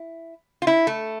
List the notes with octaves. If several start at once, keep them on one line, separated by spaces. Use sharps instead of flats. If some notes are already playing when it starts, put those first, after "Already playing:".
Already playing: E4
F4
E4
A3